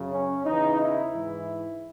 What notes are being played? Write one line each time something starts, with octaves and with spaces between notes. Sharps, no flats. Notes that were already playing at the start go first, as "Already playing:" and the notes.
Already playing: F#2 C#3 F#3
C#4
E2 C#3 E3 D#4
E4
G#2 E3